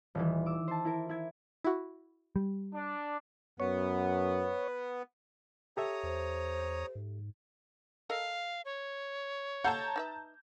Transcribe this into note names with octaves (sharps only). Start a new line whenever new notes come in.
D#1 E3
D6 E6
C5 A5
E4 A#4
E4 G#6
E4 F#4
G3
D4
F#2 B3 C#5
G4 A4 C#5 E5 A#5 D#6
E2 C5
G#2
A4 A#4 D#5 F5
C#5
A4 F5 F#5 A5 A#5 G6
D#4 B4 E5